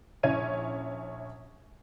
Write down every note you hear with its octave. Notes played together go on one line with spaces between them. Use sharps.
A#1 C#4 E4 C#5 G#6 D#7